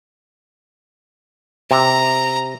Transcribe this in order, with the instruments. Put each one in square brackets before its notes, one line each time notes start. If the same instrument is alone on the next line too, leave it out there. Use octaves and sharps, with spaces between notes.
[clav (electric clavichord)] C3 [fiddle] A#5